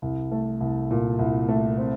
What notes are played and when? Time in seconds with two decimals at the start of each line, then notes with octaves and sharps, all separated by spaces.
0.02 C2
0.31 A3
0.60 C2
0.91 A#2
1.19 C2
1.48 A3
1.78 C4